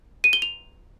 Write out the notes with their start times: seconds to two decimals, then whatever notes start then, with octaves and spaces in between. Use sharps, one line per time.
0.24 D#7
0.33 G7
0.42 F7